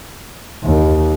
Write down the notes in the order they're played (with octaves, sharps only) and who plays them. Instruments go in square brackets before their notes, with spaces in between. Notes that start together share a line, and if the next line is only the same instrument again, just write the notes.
[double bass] D#2